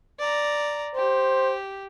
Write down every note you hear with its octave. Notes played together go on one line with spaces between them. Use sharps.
D5 A#5
G4 C5